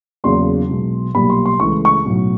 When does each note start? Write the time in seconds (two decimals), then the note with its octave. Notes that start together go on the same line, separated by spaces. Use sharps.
0.24 E2 C#3 F#3 A#3 C6
0.69 B1 B2 G#3
1.15 B1 A#2 G3 A#3 B5
1.30 C6
1.46 C6
1.60 C#2 C#3 E3 A3 C#6
1.85 C#6
2.05 B1 A2 F#3